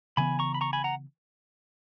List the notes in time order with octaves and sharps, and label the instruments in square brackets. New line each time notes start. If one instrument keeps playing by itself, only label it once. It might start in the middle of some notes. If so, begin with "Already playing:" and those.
[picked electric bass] C#3 E3 B3 [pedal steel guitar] G#5 B5
[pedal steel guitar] A#5 C#6
B5
A#5 C#6
G#5 B5
F#5 A#5